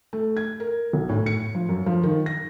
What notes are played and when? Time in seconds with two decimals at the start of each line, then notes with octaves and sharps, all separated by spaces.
0.13 A3
0.37 G#6
0.60 A#4
0.93 B1
1.09 A2
1.26 C#7
1.55 F3
1.69 F#2
1.86 F3
2.03 D#3
2.26 A#6